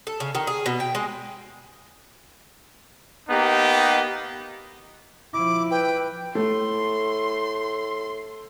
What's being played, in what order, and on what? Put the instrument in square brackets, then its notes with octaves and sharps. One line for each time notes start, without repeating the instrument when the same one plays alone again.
[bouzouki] A4
C#3
D#3
G#4
B2
G5
G#3
[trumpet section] A#3 B3 D#4 G4
[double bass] F3 E4 [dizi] D6
[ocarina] B4 [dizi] G5
[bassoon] A2 [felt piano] A3 [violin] C6